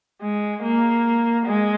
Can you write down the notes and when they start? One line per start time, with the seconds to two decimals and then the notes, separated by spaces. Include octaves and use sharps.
0.21 G#3
0.63 A#3
1.46 G#3